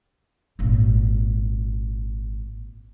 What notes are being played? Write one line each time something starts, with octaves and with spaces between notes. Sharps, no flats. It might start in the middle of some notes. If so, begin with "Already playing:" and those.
G#1 A#2